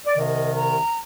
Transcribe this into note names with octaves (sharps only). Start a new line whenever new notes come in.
D5
C2 C3 D#3 D#5
A#5